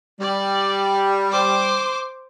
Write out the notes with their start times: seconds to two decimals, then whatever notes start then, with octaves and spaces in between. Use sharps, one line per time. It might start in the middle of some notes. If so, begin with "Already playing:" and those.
0.21 G3 D5
1.32 C5 D6